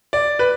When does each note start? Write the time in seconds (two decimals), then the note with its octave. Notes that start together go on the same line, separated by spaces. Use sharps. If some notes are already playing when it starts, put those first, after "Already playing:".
0.13 D5
0.39 B4